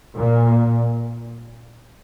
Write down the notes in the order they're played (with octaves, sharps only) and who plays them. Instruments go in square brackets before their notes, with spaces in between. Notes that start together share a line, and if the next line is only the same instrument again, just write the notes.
[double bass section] A#2